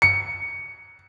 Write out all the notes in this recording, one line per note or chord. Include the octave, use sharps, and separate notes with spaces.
C#7